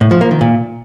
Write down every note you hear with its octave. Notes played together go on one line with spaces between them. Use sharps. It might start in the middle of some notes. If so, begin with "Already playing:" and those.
A2
F3
A#3
D#3
A#2